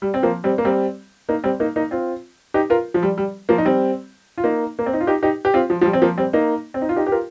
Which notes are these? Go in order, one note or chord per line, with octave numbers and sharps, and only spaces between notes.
G3
C4
F3 A#3
G3 C4
A#3
G3 C4
A#3 D#4
G3 C4
A#3 D#4
A#3 D#4
C4 F4
D#4 G4
F4 A#4
F3
G3
G3
F3 A#3
D#4
G3 C4
F4
A#3 D#4
A#3
C4
D#4
F4
D#4 G4
D#4 G4
G4
C4 F4
F3
F3
G3
C4
F3 A#3
G3 C4
A#3 D#4
C4
D#4
F4
D#4 G4
G4
F4 A#4